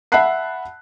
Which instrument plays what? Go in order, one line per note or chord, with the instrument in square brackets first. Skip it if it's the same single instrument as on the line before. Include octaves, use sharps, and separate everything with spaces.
[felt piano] E5 F#5 A5 B5 F#6 C7